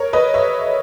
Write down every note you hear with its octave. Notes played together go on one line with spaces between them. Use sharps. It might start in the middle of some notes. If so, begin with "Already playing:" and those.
Already playing: A#4 C#5
B4 D#5
C#5 E5